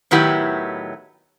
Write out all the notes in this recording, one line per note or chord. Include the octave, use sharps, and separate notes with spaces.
A2 D#3 F#3 B3 E4 G4